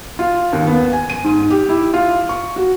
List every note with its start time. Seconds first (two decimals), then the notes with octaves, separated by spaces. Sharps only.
0.19 F4
0.53 D#2
0.67 B3
0.93 G#5
1.10 D#7
1.24 G#2
1.50 G4
1.69 E4
1.93 F4
2.29 C#6
2.56 F#4